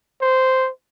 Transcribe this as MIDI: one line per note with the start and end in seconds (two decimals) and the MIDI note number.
0.21 0.69 72